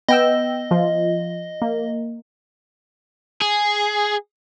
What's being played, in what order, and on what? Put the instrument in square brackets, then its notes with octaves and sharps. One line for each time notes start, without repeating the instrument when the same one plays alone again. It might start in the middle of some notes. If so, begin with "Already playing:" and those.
[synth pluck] B3 G5 E6 [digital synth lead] D#5
[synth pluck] F3 F4
A#3
[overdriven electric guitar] G#4